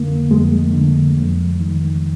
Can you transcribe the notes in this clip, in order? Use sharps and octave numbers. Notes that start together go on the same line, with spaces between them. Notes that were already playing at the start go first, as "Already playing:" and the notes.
Already playing: F2 D3 A#3
F2 G#3
D3
F2
D#3